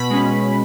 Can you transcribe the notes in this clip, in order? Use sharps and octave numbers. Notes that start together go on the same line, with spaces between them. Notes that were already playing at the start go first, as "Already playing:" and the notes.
Already playing: B2 B5
G#3 C#4